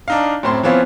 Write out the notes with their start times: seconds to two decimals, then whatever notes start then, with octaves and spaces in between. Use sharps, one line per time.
0.08 D4 D#4 F5
0.43 F#2 A2 C4 C6
0.63 E3 F3 B3 C4 F4 C#5